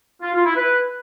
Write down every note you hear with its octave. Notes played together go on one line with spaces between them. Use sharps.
F4
F4
E4
B4